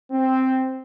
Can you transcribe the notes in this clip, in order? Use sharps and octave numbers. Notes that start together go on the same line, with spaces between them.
C4